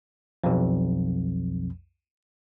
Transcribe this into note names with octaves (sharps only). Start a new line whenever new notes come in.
B1 F2